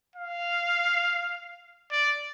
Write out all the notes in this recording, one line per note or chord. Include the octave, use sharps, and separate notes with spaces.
F5
D5